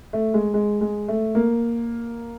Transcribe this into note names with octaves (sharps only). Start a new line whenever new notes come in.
A3
G#3
G#3
G#3
A3
A#3